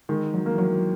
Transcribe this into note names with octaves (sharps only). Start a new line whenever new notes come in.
D#3 G#3
F#3
A#3
E3
F#3